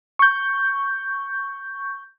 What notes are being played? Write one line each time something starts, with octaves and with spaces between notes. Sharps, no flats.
C#6 G6